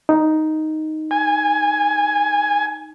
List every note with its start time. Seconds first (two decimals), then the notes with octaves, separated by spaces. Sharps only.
0.09 D#4
1.11 G#5